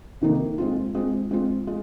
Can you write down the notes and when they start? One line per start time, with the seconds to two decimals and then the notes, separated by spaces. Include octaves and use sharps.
0.21 C3 D#3 A#3 D#4
0.58 G#3 C4 F4
0.95 G#3 C4 F4
1.31 G#3 C4 F4
1.67 G#3 F4